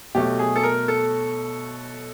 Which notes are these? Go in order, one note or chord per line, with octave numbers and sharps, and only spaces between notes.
B2 F#3 A3 G4
G#4
A4
A#4
A4